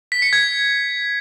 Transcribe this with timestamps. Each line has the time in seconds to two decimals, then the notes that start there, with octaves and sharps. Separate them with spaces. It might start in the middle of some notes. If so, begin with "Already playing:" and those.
0.12 B6
0.22 C#7
0.33 G#6